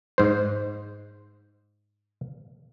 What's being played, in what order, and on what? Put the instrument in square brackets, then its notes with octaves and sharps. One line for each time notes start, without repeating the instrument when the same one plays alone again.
[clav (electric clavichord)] G#2 C5